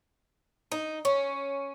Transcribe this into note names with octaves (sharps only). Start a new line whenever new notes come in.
D#4
C#4